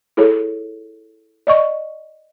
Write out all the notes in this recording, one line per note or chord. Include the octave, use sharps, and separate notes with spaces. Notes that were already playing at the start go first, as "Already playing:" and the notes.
E4 G#4 A4 C#5
D5 D#5 C#6